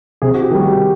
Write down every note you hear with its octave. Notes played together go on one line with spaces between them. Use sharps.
C3 G#4
F#4
G4
D#3 G3
F#4